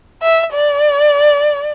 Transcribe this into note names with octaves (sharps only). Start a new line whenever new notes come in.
E5
D5